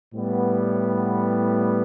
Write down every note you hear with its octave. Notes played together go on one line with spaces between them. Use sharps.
A2 G3 B3